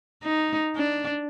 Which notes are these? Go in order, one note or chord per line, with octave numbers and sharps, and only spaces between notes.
D#4
D4